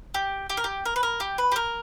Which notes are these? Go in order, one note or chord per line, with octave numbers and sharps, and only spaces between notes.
G4
G4
A#4
G4
A#4
B4
A#4
G4
B4
G4
A#4